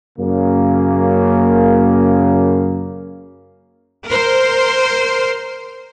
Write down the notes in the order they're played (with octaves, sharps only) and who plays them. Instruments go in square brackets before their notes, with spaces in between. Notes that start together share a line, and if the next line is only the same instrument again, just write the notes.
[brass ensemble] F#2 C#3 A#3
[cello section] A#4 C5